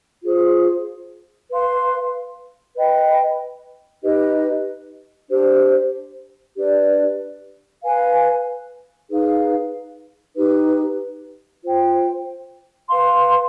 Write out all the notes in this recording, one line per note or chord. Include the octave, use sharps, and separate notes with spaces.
F4 G#4 C5
B4 F5 C6
B4 D#5 G5 B5
D#4 G4 B4 D#5
D4 G4 C5
D4 G4 B4 D5
B4 F5 G#5
D#4 G#4 B4 F5
D#4 G4 B4
F4 C5 G5
B4 F5 C6